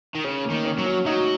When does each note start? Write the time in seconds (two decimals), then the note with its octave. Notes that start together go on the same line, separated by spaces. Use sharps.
0.15 D#3
0.24 C#3 C#4
0.45 A#3
0.51 D#3
0.65 C#4
0.79 F#3
0.86 C#4
1.06 F#3 D#4